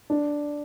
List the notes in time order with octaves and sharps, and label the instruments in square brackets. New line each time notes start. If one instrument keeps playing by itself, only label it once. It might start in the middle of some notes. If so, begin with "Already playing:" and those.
[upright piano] D4